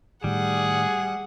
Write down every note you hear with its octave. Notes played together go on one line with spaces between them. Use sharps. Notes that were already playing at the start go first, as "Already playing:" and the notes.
A2 D#3 G3 G#4 F#5